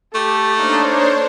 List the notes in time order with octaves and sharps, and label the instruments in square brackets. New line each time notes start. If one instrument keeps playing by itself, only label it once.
[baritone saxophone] A3 [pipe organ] G4 [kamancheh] A4
[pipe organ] A#3 D#4 [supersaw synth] D4 C5 C#5